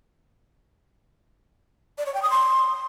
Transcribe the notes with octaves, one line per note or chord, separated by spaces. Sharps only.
D5
C#5
G5
D#6
C6